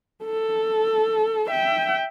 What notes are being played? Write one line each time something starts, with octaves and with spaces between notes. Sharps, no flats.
A4
E5 G5